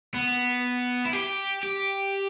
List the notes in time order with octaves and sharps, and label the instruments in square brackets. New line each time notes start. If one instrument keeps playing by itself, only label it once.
[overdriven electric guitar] B3
E4
G4
G4